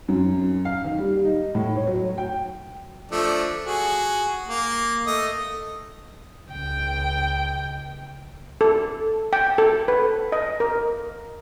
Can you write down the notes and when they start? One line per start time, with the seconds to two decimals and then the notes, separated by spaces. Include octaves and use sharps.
0.08 F#2
0.65 F5
0.84 D#3
0.99 G3
1.25 D#4
1.55 A2
1.76 C#5
1.87 F#3
2.18 G5
3.11 F3 A3 D4
3.65 F#4 G#4
4.48 A#3
5.07 A3 D#5
6.51 C#2 G5
8.61 A4
9.33 G5
9.58 A4
9.88 B4
10.32 D#5
10.60 A#4